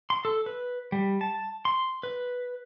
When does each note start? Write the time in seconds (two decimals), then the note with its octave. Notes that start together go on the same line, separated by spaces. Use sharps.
0.10 C6
0.25 A4
0.46 B4
0.92 G3
1.21 A5
1.65 C6
2.03 B4